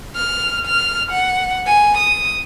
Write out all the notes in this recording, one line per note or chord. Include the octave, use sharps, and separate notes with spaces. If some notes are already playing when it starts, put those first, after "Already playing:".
F6
F6
F#5
G#5
D#6